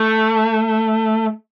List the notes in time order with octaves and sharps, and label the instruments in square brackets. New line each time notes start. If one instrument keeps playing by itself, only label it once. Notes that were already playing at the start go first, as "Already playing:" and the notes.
Already playing: [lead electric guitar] A3